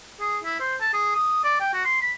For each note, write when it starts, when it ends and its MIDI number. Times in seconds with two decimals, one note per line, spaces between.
0.20 0.38 68
0.44 0.58 64
0.60 0.76 72
0.81 0.90 81
0.93 1.14 68
1.16 1.41 87
1.44 1.60 74
1.60 1.70 79
1.73 1.81 66
1.85 2.00 84
2.02 2.12 83